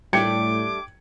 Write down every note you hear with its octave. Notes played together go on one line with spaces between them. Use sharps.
A2 G3 A3 D4 G5 D6 G#6 C#7